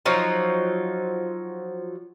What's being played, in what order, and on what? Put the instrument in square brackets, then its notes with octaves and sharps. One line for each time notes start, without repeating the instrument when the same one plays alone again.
[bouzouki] F3 F#3 D#4